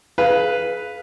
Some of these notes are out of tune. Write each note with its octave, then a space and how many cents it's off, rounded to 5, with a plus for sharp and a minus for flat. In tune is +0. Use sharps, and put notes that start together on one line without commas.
G#4 +30 B4 +0 F5 +0